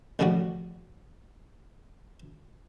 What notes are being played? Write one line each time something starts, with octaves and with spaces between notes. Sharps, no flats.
A1 C#3 F3 G3 F#4